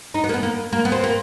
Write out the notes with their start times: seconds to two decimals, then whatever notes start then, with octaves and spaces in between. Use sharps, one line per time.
0.14 D#4
0.24 B3
0.29 A#3
0.34 B3
0.43 A#3
0.73 A#3
0.85 B3
0.92 C4
1.04 A#3